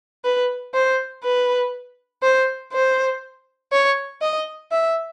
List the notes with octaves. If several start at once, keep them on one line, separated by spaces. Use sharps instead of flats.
B4
C5
B4
C5
C5
C#5
D#5
E5